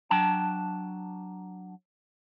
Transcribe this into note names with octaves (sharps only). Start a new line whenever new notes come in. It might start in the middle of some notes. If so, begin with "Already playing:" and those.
F#3 D4 G5 A5